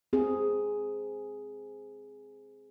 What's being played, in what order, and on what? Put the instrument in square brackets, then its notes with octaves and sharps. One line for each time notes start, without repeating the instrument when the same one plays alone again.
[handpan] C4 G#4